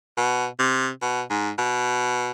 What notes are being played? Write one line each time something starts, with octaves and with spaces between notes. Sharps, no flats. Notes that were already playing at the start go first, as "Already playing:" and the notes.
B2
C3
B2
G#2
B2